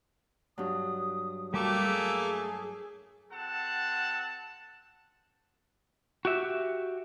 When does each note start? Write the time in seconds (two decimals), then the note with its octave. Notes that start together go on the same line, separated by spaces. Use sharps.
0.58 G2 F#3 D#6
1.54 G3 A3 A#3 F#4 D6
1.85 G#4 E6
3.32 C4 F#4 A4 F#5 A5
6.25 F#4 G4 E5